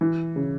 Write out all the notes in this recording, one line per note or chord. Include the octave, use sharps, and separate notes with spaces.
E3
C#3